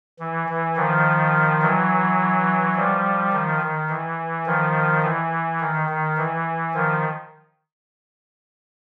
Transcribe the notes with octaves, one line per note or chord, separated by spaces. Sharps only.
E3
E3
D#3 F3
E3 F#3
F3 G3
D#3 F3
D#3
E3
D#3 F3
E3
D#3
D#3
E3
D#3 F3